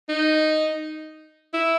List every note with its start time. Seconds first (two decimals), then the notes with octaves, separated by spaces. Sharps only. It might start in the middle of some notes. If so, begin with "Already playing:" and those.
0.09 D#4
1.54 E4